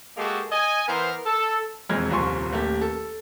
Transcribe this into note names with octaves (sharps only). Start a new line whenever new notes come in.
G#3 A#3 F#4 G4 A4
D#5 G#5
E3 B3 A#4 C5
A4
E1 F2 G#3 F6 G#6
D#1 C2 F3 G#5 C6 C#6
D#1 A3 A#3 G4
A4